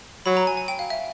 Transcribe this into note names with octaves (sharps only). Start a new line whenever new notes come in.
F#3 B5
A#5
G#5
G#5
G5
F5
E5